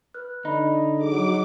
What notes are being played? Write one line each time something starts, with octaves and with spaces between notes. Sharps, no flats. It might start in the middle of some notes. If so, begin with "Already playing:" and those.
B4 F6 F#6
D3 D#4 D5 B5
F#3 G#4 A4 D#5 D6